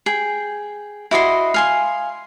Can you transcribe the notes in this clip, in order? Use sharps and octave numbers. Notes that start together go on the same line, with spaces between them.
G#4 G5
E4 F#4 D#5 C6
F5 G#5 C6